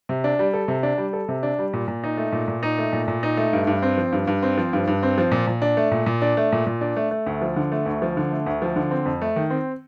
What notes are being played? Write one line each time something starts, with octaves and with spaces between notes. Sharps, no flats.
C3
D4
G3
A4
C3
D4
G3
A4
C3
D4
G3
A#2
A#2
D#4
A3
A#2
A#2
D#4
A3
A#2
A#2
D#4
A3
G2
G2
C4
F3
G2
G2
C4
F3
G2
G2
C4
F3
A#2
A#2
D4
A3
A#2
A#2
D4
A3
A#2
A#2
D4
A3
A3
D2
F3
D3
A3
D2
F3
D3
A3
D2
F3
D3
C4
F2
A3
D#3
C4